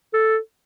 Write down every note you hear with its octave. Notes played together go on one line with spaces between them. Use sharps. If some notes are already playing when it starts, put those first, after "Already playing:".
A4